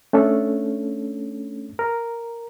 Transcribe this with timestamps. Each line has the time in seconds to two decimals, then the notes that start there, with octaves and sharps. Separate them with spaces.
0.13 A3 C#4 D4 A4
1.79 A#4